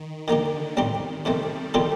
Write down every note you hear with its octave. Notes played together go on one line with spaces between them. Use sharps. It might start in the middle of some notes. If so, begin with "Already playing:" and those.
Already playing: D#3
D3 D#3 A#3 D#4 G4
A2 D#3 G3 C4 D#4 G4
C3 D#3 G3 A3 C4
D#3 G3 C4 F4 A4